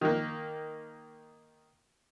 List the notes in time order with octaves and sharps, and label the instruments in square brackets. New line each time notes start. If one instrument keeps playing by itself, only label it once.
[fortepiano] D#3 A#3